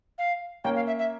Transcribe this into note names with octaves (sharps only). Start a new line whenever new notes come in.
F5
A#3 C#4 G5
F5
E5
E5